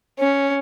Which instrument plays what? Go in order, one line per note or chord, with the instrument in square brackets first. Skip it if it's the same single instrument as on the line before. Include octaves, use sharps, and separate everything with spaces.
[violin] C#4